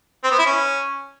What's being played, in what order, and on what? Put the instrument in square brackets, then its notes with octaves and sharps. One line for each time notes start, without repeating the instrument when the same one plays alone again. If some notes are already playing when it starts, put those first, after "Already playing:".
[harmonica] C4
B3
E4
C#4